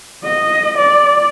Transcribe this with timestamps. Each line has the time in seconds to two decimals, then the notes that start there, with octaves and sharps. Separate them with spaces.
0.24 D#5
0.78 D5